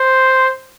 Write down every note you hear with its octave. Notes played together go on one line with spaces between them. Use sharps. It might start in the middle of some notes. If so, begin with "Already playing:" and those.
Already playing: C5